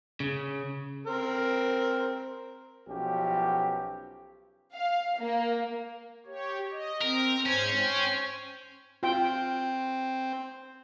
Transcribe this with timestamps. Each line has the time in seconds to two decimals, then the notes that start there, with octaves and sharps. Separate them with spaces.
0.20 C#3
1.07 C4 A#4
2.88 B1 F3 C#4 G4
4.73 F5
5.18 A#3
6.26 G4 C#5
6.71 D#5
7.02 C4 A#4
7.46 G#2 C#4 C5 G#6
7.77 C5 C#5 G5
9.03 C4 F4 G5